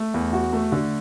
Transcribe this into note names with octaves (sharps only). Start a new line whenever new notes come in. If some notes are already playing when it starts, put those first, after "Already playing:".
Already playing: A3
E2
F#4
A3
D3